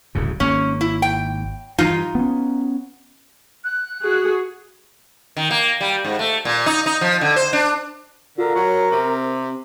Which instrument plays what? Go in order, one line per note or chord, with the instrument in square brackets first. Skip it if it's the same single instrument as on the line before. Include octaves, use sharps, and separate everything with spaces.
[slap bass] D1 G2 C#3
[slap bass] G#1 A#3 [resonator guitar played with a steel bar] C#4
[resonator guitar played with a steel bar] E4
G5
[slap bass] G2 E3 [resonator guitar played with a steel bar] D#4 F4
[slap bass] B3 C#4
[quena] F#6
[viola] F#4 G#4
[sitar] D#3
A#3
G3
G#2
A3
A#2
D#4
D#4
F3
D3
C5
D4
[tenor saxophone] D3 [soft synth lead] F4 [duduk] A#4
[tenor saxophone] F#3 [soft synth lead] C#5
[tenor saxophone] C3 [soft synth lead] C4